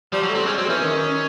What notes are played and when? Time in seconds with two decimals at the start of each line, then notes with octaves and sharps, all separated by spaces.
0.12 F3 G3
0.23 F#3
0.29 A3
0.35 C4
0.46 G#3 C#4
0.58 F#3 C4
0.69 E3 C#4
0.81 D#3